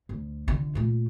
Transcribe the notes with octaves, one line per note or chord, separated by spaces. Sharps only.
D2
F1 D3
A#2 A3